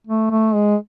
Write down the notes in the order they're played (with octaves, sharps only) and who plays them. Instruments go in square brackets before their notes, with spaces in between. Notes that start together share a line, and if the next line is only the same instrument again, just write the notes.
[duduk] A3
A3
G#3